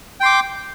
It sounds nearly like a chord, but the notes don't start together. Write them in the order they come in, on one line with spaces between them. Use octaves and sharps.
G5 C6 D6